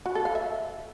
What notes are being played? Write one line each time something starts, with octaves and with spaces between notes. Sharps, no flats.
F#4
A4
F5
E5